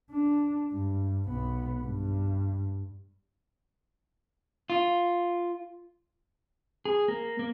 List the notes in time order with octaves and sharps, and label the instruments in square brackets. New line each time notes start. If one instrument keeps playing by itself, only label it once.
[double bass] D4
G2
B1 B3
G2
[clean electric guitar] F4
[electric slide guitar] G#4
A#3
A#3